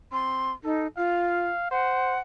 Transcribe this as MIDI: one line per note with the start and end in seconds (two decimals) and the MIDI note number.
0.12 0.54 60
0.12 0.52 84
0.64 0.87 63
0.64 0.87 69
0.97 1.47 65
0.97 1.71 77
1.71 2.19 72
1.71 2.20 78